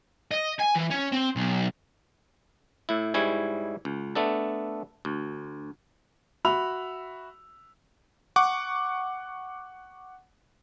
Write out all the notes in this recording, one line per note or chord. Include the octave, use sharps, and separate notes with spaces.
D#5
G#5
E3
C#4
C4
B1
A2 E4
G#2 G3 E4 C#5 G#5
C#2
A3 B3 D4 A4
D2
F#4 E5 B5 E6 F7
F#5 C#6 D6